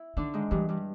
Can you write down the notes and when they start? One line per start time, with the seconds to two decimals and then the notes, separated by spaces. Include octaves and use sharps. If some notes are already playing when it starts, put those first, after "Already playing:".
Already playing: E4
0.17 D3 D#3 D4
0.34 G#2 G#3
0.51 G2 E3 G3
0.69 G2 G3